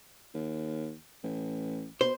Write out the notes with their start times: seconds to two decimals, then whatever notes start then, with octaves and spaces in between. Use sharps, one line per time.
0.34 D#2
1.24 A1
2.01 B2 C5